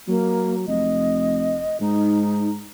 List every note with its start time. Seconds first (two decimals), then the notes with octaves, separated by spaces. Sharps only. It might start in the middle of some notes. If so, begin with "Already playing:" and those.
0.08 F#3 A#3
0.68 F1 D#5
1.81 G#2 D#4